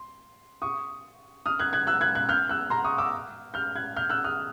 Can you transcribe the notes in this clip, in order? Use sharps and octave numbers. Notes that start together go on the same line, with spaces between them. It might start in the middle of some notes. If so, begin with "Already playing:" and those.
Already playing: C6
C#6 D#6
D#6 F6
F#6 G#6
F#6 G#6
E6 F#6
F#6 G#6
F#6 G#6
F6 G6
E6 F#6
A#5 C6
C#6 D#6
D6 E6
F6 G6
F#6 G#6
F6 G6
E6 F#6
D#6 F6